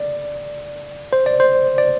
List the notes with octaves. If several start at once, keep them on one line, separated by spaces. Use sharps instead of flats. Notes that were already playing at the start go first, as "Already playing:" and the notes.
Already playing: D5
C5
D5
C5
D5